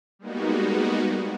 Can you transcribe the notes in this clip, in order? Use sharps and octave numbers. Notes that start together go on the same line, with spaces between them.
G3 G#3 A#3 B3 D#4 F#4